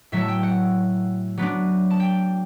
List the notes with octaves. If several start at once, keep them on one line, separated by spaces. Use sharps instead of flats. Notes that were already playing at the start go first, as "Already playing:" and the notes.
A2 F#3 A3 E5
A5
G5
F#5
F#3 B3 D4
A5
G5